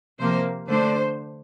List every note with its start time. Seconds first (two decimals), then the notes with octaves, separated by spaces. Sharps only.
0.19 C3 F3 A#3 C5
0.68 D3 A3 D4 C5